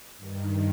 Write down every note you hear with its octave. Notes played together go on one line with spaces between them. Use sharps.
G2 D#3